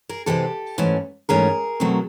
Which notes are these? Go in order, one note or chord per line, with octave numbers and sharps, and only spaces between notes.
G#4 A#4
C3 E3 G#3 C4 G4 A4
G#2 E3 A3 C#4
G#2 E3 A3 C#4 G#4 A#4
B2 F#3 A3 C4